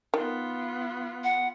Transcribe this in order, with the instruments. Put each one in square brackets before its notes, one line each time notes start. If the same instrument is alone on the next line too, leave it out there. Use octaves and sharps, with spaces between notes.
[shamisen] D#3 [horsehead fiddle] B3 F4
[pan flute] F#5